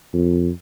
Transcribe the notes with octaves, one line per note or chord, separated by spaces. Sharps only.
F2